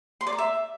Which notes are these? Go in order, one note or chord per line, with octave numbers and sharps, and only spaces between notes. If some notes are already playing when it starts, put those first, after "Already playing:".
C6
D5
A#5
E5